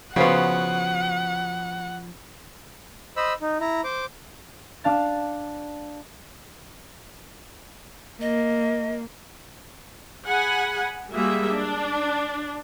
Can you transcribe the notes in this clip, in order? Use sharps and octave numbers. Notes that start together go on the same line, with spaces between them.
C#3 F3 B3 F#4 C5 F5 F#5
C5 D#5 B5 E6
D#4
E4 A#5
C5 D6
D4 F5 A5 A6
A#3 D#5
G#4 F#5 G#5 B5
G3 G#3 A#3 F#4 G#4 E5
D4